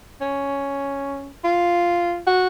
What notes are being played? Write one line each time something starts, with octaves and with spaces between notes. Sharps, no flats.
C#4
F4
F#4